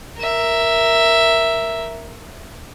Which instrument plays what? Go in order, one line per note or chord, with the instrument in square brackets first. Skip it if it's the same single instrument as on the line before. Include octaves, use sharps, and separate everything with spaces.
[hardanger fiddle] A#4 E5